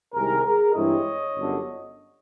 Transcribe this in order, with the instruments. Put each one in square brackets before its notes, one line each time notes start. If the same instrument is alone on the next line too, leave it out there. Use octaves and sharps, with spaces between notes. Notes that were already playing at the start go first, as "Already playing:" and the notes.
[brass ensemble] C2 C3 D#3 G#3 G#4 A#4
G#4 A#4
G2 E3 G#3 C4 E4 C#5 D#5
G1 F#2 D3